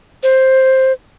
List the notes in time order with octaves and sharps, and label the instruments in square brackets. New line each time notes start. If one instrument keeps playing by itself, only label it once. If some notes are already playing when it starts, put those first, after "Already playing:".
[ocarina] C5